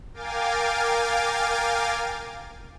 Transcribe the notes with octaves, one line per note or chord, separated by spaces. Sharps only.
A#4 F5 G5 G#5 D6 A6